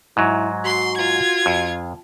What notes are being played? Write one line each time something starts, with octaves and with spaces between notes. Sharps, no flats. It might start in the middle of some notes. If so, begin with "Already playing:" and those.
G#2 F#3 E4
F#4 C6
F4 G#6
F2